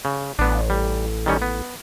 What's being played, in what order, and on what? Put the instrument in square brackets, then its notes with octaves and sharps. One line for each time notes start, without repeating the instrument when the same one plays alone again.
[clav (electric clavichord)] C#3
[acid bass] A1 [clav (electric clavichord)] B3 D4
[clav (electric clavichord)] G3
D#3 G3 C#4
B3